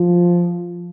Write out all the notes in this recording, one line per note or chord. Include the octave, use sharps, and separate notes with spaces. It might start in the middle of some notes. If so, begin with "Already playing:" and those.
Already playing: F3